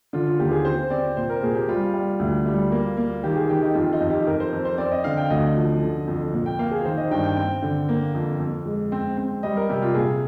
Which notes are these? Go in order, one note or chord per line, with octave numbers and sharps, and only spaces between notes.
D3 F4
F4
D#2 G4
G#4
C4 C5
C4 D5
A#2 C5
A#4
A#2 G#4
G4
G3 F4
G3
D2
G3
A#3
A#3
D#3 G4
G#4
D#3 G4
D#4
F2 F4
D#4
F2
G4
F2 A#4
C5
F2
C5
C4 D5
D#5
D3 F5
G5
D2 D#5
F3
D3
F2
A#2
G5
A#3 F5
G#4
D#3 C5
D#5
G2 G5
G5
C4 G5
D3
A#3
F2
F2
G#3
C4
C4
G3 D#5
A#4
C3 G4
F4
A#2 G#4